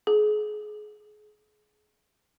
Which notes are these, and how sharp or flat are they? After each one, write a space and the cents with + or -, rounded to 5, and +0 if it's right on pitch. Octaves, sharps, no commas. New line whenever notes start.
G#4 +30